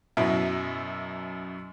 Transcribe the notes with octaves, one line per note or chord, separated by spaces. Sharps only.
F#2 B2 F#3 E4